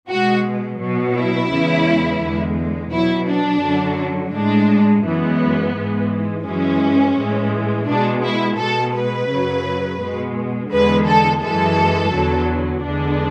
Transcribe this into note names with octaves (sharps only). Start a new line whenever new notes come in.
B2 G#3 F#4
B2 F#3
E4
E2 C#3 E3 G#3
E2 D3 G#3
B2 F#3 E4
D4
F#2 D3 F#3
A2 G#3 D4
F#2 E3 G#3 B3
G#2 E3 G#3
F#2 E3 G#3 C#4
A2 E3 G#3
B2 G#3 D4
E4
B2 G#3 A4
B4
F#2 C#3 F#3
B2 G#3
E2 D3 G#3 B4
A4
F#2 E3 G#3 A4
E2 D3 F#3
E2 D3 G#3 D4